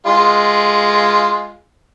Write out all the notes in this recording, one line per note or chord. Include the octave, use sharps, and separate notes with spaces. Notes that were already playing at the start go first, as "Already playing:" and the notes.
G#3 F4